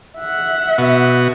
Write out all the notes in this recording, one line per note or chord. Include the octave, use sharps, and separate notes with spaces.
E5 F#5
B2 F#4